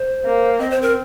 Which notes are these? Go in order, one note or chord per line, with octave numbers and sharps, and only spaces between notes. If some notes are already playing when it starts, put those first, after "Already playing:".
Already playing: C5
A#3
C4 D#5
C5
A#4